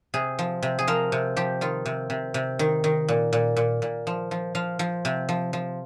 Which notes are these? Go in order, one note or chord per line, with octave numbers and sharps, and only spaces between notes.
C3 G#4
F3
C3
G#4
F3 A#4
C3
F3 G4
D#3 F4
C3
C3
C3
D#3
D#3
A#2
A#2
A#2
A#2
F3
F3
F3 F5
F3
C3
F3
F3